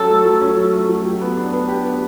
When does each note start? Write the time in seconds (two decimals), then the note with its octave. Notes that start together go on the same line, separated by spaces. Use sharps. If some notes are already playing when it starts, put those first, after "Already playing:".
Already playing: F#3 C#4 A4
0.09 A3
0.25 F#3
0.41 C#4
0.57 F#3
0.73 A3
0.89 F#3
1.04 G4
1.21 B3
1.37 D4
1.53 B3
1.68 G4
1.84 B3